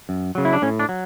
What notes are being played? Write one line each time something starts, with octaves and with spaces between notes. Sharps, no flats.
F#2
C#3 F#3
E4
D4
A2 C#4
D4
F#3